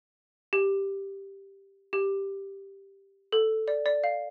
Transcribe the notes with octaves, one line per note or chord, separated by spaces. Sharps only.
G4
G4
A4
D5
D5
F5